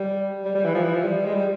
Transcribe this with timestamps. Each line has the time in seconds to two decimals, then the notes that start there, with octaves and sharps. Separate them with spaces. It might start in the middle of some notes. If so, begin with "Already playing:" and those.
Already playing: G3
0.44 G3
0.55 G3
0.65 E3
0.74 F3
0.84 E3
0.94 F3
1.04 G3
1.26 G#3
1.34 G3